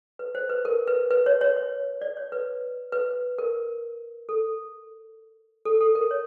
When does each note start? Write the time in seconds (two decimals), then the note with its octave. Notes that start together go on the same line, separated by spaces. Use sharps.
0.19 B4
0.35 C5
0.49 B4
0.65 A#4
0.87 B4
1.11 B4
1.26 C#5
1.41 C#5
1.56 C#5
2.02 D5
2.17 C#5
2.32 B4
2.92 B4
3.38 A#4
4.29 A4
5.65 A4
5.81 A4
5.95 A#4
6.11 C#5